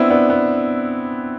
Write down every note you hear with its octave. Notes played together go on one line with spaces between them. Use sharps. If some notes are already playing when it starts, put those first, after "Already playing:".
Already playing: B3 C4 D4 E4
B3 D4
B3